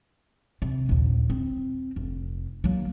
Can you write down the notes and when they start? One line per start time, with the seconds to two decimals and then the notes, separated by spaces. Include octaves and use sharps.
0.62 C3
0.89 A#1 D#2
1.30 C4
1.96 F1
2.64 F#3 A#3